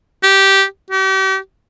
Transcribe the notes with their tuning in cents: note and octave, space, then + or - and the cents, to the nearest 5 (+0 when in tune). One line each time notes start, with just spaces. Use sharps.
G4 -10
G4 -40